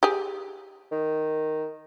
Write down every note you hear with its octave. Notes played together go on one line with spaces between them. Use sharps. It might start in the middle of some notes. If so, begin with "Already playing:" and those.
G4 G#4
D#3